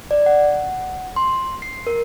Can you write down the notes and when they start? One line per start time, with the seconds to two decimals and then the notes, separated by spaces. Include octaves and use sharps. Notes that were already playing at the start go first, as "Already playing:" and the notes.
0.11 D5
0.26 F#5
1.16 C6
1.62 C7
1.87 A#4